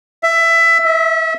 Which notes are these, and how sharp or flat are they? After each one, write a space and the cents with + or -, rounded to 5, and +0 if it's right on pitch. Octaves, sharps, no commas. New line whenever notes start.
E5 +15
E5 -35